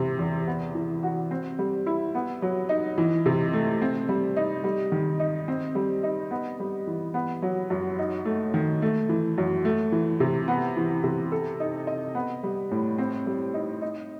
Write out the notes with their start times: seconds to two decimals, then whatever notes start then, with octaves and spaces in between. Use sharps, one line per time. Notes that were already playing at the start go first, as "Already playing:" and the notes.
Already playing: C3 E3
0.19 E2
0.47 B3
0.75 E3
1.03 F#4
1.31 C4
1.59 G3
1.86 E4
2.15 B3
2.42 F#3
2.69 D#4
2.98 E3
3.26 C3
3.53 A3
3.82 C4
4.09 G3
4.36 D#4
4.64 G3
4.92 D#3
5.20 D#4
5.48 C4
5.75 G3
6.03 D#4
6.31 B3
6.60 G3
6.87 E3
7.14 B3
7.42 F#3
7.70 F#2
7.99 D#4
8.25 A3
8.54 D#3
8.82 A3
9.09 E3
9.38 F#2
9.65 A3
9.92 E3
10.20 C3
10.48 B3
10.77 E3
11.03 C3
11.32 A4
11.60 D#4
11.87 D#5
12.15 B3
12.43 G3
12.71 A2
12.98 C4
13.27 G3
13.54 D#4
13.82 D#4